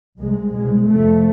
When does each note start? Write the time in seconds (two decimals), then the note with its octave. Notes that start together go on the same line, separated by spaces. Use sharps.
0.19 C2 C3 G#3
0.53 C2 B2 G#3
0.88 F2 C3 A3